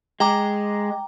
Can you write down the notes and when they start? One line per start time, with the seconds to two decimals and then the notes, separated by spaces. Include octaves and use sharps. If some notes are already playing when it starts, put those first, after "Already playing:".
0.20 G#3 G5 A#5 D6